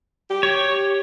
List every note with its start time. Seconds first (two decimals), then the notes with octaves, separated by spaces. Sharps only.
0.30 G4
0.43 C#5